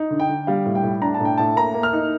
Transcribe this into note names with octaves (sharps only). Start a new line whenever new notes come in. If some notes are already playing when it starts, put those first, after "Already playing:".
Already playing: D#4
D3
G5
D3
G3 F5
A2
G5
A2
D4 A#5
A5
A2
G5
A2 A5
A#3 A#5
A#3
F6
D#4